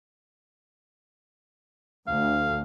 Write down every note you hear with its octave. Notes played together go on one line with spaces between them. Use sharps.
D2 F5